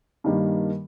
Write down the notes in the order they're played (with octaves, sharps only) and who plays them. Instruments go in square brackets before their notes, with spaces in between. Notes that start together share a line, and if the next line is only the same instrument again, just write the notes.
[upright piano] G2 D#3 G3 A#3